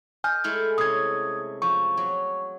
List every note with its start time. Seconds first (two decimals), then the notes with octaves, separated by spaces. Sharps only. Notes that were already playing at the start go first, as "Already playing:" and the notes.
0.24 D#5 G#5 F6 G6
0.44 G#3 A3 E4
0.78 C3 C#4 D#6 G#6
1.62 F3 C#6
1.97 F#3